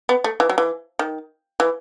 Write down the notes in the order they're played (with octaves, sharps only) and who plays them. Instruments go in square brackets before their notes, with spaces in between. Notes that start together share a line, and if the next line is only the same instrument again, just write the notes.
[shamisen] B3
A3
E3
F#3
E3
D#3
E3